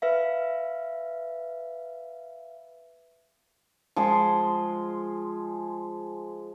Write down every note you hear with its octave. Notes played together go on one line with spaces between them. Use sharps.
B4 E5 F5
F3 G#3 C6